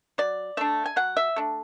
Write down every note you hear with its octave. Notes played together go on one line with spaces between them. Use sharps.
F#3 D5
A3 D4 E5
G#5
F#3 F#5
E5
A3 D4